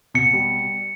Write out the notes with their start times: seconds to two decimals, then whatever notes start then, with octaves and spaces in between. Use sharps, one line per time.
0.14 B2 C#7
0.33 G3